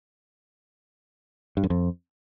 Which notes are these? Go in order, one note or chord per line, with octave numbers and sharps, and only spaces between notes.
G2
F#2
F2